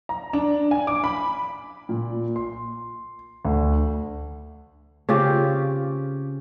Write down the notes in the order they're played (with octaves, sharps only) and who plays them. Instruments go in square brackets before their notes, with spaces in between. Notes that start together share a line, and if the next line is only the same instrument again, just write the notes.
[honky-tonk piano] A#5
D4
G#5
D6
B5
[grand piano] A#2
C6
D2
[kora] C#3 C4 F4 G4